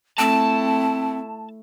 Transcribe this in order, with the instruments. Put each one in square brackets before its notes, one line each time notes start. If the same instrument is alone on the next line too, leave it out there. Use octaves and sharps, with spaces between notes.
[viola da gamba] A3 E4 [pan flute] C4 [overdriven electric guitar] A5